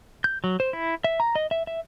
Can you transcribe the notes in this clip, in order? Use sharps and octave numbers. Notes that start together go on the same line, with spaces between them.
G6
F#3
C5
E4
E5
A#5
D#5
E5
E5